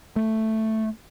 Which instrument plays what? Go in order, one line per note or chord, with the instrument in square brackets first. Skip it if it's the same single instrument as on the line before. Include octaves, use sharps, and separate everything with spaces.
[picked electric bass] A3